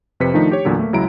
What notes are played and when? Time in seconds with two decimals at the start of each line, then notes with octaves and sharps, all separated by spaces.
0.20 F2 C3 B4 C5 B6 C#7
0.34 D#3 F3 A3 D4 D#4
0.52 G4 C#5
0.65 E2 A#2 D3 F#3
0.79 A3 A#3
0.93 C#2 F#3 G#3 E4 A#5 D7